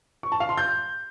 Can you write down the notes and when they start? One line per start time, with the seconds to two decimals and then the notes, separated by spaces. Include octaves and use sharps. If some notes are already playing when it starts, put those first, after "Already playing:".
0.23 C#6
0.32 A5
0.40 F5
0.49 C6
0.57 G6